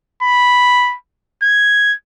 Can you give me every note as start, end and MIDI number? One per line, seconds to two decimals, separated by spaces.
0.23 0.95 83
1.43 1.94 92